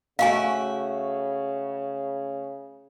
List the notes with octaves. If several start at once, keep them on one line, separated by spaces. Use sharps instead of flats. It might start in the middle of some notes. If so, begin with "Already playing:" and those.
C#3 A3 F#4 E5 F5 G#5